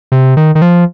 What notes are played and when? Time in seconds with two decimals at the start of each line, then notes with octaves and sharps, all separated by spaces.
0.12 C3
0.37 D#3
0.55 D#3
0.62 F3